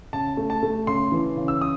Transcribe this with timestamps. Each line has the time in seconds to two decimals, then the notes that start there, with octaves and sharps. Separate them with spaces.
0.13 C#3 A5
0.37 A3
0.50 A5
0.63 A3
0.87 C#3 C6
1.12 E3
1.37 C#3
1.48 E6
1.61 D#6